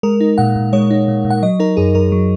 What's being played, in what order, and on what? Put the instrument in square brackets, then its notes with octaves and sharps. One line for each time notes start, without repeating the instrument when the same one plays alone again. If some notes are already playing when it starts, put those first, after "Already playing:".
[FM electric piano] G#3 A#4
D#4
A#2 F#5
A#2
G#3 C#5
D#4
A#2
A#2
F#5
F#3 D#5
D#4 A#4
F#2 G#4
F#2 A#4
F#3